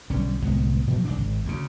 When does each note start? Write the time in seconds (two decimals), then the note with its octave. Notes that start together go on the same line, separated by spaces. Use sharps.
0.10 B1 D3 G3 C#4
0.42 D1 C2 G#3 B3
0.87 A#2 F3 F#3
1.05 C2 C#3 D4
1.18 G#1
1.45 D2 C#3